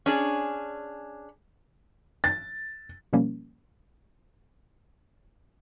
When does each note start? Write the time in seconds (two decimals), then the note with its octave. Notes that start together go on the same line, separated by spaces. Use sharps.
0.06 C#4 D4 G#4
2.24 A6
3.13 B2 F3 G3 A#3 C#4